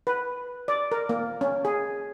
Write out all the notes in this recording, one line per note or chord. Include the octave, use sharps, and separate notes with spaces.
B4
D5
A#4
A#3
C#4
G#4